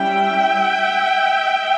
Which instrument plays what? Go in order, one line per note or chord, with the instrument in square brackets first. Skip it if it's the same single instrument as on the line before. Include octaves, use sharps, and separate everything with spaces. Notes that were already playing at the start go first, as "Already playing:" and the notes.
Already playing: [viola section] G3 C#4 E4 E5 G5